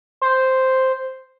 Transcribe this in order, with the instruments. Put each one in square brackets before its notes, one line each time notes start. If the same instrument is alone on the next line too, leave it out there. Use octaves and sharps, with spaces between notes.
[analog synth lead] C5